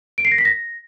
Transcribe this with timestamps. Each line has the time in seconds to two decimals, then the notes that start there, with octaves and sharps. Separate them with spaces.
0.18 D7
0.25 C7
0.32 A#6
0.38 B6
0.45 A#6